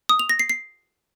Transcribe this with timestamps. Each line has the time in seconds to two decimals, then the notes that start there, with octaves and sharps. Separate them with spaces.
0.09 D#6
0.19 F7
0.29 A#6
0.39 C7
0.49 C7